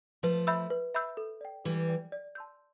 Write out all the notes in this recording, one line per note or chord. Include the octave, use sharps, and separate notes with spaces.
F3 A3 B4
E5 B5 E6 G6
B4
E5 B5 E6 G6
A4
D5 G5
E3 G3 A4
D5 G5
D5
A5 C6 E6 G6